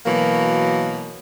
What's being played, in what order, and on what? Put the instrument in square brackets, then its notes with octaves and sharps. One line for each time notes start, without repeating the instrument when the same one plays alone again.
[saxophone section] B2 E3 F#3 A#3